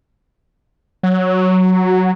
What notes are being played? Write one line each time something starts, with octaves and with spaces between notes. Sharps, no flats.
F#3